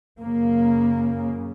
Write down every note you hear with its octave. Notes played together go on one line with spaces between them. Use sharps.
F#2 C#3 A#3